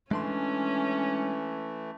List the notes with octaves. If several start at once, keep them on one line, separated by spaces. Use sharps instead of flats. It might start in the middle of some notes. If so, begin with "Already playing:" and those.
E3 G#3 A3 C#4 D4 C6